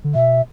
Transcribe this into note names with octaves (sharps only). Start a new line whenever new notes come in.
D3
B2 E5